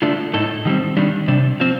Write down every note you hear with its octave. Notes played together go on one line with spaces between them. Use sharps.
D3 A3 D4 F4
A2 A3 D#4 A4
D#3 G3 C4
D#3 G3 D4
C3 G3 D4
F3 C4